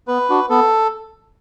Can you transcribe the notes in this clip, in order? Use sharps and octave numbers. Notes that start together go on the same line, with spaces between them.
B3 B4
D4 F#4
B3 A4